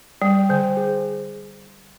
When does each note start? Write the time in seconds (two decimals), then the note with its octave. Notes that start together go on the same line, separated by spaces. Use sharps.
0.22 G3 G5
0.49 D3 C5
0.77 G#4